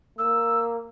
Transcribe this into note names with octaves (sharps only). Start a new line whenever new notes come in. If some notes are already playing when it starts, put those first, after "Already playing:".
A#3 E6